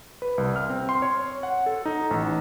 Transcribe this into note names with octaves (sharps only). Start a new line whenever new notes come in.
B4
C2
F6
C4
C6
C#5
F#5
A4
D#4
A1